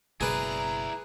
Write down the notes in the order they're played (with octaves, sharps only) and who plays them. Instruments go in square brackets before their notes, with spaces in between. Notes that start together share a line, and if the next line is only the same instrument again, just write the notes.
[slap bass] F#1 B2 G#3 [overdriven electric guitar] E4 D5 [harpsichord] G#4 B4 [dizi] A#5